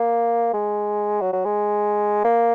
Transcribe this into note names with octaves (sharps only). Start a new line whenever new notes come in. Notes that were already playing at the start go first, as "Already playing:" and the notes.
Already playing: A#3
G#3
F#3
F#3
G#3
A#3